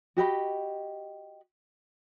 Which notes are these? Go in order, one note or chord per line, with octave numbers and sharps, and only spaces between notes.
F#4 G4 D#5 B5